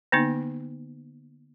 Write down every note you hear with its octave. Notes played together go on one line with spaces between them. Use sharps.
D3 A#3 B3 D#4